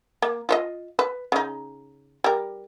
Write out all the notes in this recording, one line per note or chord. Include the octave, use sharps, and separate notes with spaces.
A#3
F4 C5 D#5
B4
C#3 D#4
G3 A#4